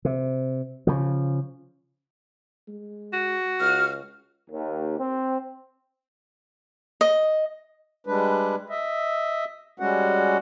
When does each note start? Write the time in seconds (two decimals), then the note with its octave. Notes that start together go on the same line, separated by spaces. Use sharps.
0.05 C3
0.87 C#3 F3
2.68 G#3
3.13 F#4
3.60 C#2 F6
4.50 D#2
4.98 C4
7.01 D#5
8.07 G3 G#3 D4 B4
8.70 D#5 E5
9.80 G3 G#3 C#4 F#4 F#5